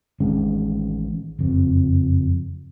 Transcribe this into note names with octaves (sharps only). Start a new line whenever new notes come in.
A1 D#3 G#3 C#4
F#1 F2